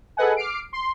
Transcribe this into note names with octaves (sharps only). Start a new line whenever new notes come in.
G#4 A4 B4 D#5 F#5 G#5
D6 F6 C7 D7
C6